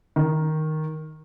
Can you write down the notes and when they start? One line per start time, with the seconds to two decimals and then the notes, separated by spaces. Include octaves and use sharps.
0.16 D#3